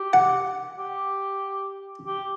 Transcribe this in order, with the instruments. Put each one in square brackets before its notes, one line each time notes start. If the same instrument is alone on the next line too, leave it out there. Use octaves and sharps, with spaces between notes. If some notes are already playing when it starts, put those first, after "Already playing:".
Already playing: [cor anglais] G4
[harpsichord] F#5
[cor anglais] G4
G4